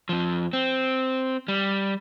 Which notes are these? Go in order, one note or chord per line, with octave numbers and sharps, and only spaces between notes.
F2 F3
C4
G3